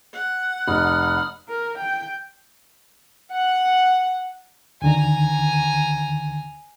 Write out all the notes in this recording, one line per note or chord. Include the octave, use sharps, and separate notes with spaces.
F#5
F1 B5 D#6 F6
A#4
G5
F#5
D2 D3 D#3 G#5 A#5